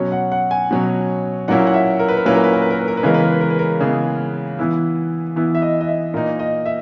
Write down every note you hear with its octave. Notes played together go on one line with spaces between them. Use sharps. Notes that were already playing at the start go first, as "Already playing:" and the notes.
Already playing: B2 F#3 C#4
F#5
F#5
G#5
B2 F#3 C#4
A#2 F#3 A#3 C#4 E4 F#5
F#5
E5
A#4
B4
A#4
A#2 F#3 A#3 C#4 E4 B4
A#4
B4
A#4
B4
A#4
B4
A#4
B4
C#3 E3 G#3 B3 A#4
B4
A#4
B4
A#4
B4
A#4
C#3 E3 G#3 B3 G#4
E3 B3 E4
E3 B3 E4
E5
D#5
D#5
E5
A#2 A#3 D#4 A#4
D#5
E5